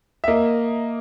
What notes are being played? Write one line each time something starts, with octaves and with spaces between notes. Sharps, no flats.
E5
A#3 D#5